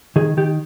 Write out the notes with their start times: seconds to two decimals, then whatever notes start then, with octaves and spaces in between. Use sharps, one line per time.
0.16 D#3 G#4
0.37 D#3 G4